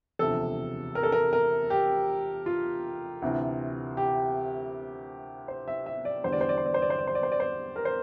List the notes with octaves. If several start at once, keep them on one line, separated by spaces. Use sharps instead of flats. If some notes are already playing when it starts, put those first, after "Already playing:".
E1 D2 C3 F3 A4
A#4
A4
A#4
A#4
G4
F4
D2 C3 E3
G4
C5
E5
E5
D5
E2 D3 G3 C5
D5
C5
D5
C5
D5
C5
D5
C5
D5
C5
D5
C5
D5
C5
A#4
C5